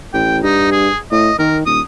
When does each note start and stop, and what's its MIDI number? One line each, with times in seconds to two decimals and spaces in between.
0.14 0.38 33
0.14 0.38 79
0.44 0.89 43
0.44 0.70 63
0.72 0.97 68
1.12 1.30 45
1.12 1.35 75
1.39 1.65 51
1.39 1.58 70
1.66 1.81 27
1.66 1.81 87